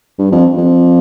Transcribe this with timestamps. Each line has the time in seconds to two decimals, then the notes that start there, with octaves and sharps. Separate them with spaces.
0.19 G2
0.32 F2
0.58 F2